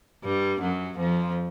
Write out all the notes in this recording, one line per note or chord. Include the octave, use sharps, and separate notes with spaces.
G2 G3
F#2 F#3
F2 F3